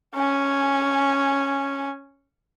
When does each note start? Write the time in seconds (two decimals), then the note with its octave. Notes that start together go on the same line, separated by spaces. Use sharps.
0.15 C#4 G#5